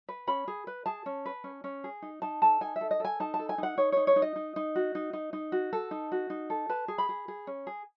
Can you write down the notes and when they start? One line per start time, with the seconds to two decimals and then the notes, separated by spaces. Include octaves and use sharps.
0.09 B4
0.27 C#4 B5
0.48 G#4
0.67 B4
0.86 G#4 A5
1.06 C#4
1.26 B4
1.44 C#4
1.64 C#4
1.84 G#4
2.02 D#4
2.22 D#4 A5
2.42 A4 A5
2.61 D#4 G#5
2.76 E5
2.81 A4
2.91 D#5
3.00 A4 G#5
3.20 D#4 A5
3.34 A5
3.39 A4
3.49 G#5
3.58 D#4 F#5
3.78 D#4 C#5
3.92 D#4 C#5
4.07 C#5
4.16 D#4
4.22 D#5
4.36 D#4
4.56 D#4
4.76 F#4
4.95 D#4
5.13 D#4
5.33 D#4
5.52 F#4
5.73 A4
5.91 D#4
6.12 F#4
6.30 D#4
6.50 A4
6.69 B4 A5
6.88 G#4
6.98 B5
7.09 G#4
7.28 G#4
7.47 C#4
7.67 G#4